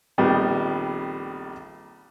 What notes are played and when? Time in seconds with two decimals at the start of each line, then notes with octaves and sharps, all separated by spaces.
0.18 A#1 F2 D#3 G3 B3 D#5